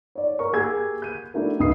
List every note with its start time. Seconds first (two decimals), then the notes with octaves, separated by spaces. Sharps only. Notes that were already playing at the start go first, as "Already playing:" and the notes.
0.15 C#5 D5
0.39 A#4 C#6
0.53 A#3 G4 G#4 C#6 E6 G#6
1.02 G6 D#7
1.34 A3 D4 E4 F#4 A#4
1.60 C#2 D#6 C7